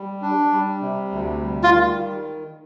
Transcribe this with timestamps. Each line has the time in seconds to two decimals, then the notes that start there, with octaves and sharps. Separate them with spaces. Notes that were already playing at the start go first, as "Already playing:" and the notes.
Already playing: G3
0.22 D4
0.52 G3
0.82 C3
1.12 D2
1.41 G3
1.63 F4
1.71 D#3